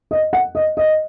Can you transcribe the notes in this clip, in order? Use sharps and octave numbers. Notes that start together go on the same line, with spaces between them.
D#5
F#5
D#5
D#5